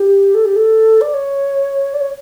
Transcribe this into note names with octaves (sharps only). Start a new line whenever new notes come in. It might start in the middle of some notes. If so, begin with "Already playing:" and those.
Already playing: G4
A4
G4
A4
D5
C#5
D5
C#5